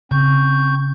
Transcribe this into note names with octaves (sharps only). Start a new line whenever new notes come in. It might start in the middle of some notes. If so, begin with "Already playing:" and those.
C#3 C4 C#6 G6